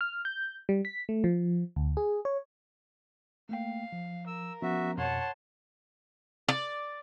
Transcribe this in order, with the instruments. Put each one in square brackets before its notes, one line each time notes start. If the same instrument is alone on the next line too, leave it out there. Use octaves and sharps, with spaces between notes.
[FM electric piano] F6
G6
G3
B6
A3
F3
D2
G#4
C#5
[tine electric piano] A3 A#3 G5 [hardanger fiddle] F5
[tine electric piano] F3
[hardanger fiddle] A#4 [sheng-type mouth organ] E6
[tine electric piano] F3 B3 C#4 [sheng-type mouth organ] F#4 E5
[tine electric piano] F2 B2 [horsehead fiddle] C#5 F#5 [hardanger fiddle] A5 [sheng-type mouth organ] C6
[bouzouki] D5